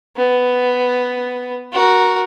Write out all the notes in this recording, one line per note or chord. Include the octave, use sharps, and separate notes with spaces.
B3
F#4 A#4